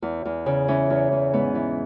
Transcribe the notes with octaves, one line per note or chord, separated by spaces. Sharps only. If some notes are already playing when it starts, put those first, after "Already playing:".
E2
E2
C#3
E3 C#4
E2
E2
G#2 B3
E3